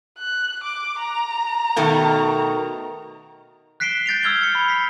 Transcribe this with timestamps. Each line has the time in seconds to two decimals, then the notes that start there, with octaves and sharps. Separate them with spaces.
0.18 F#6
0.63 D6
0.98 A#5
1.76 B2 D#3 A3
3.80 F#6 B6 C7 D7 E7 G7
4.06 G6 A6 D7 F7
4.23 E6 F6 G#6 G7
4.41 A6 C#7
4.55 B5
4.68 B6 C7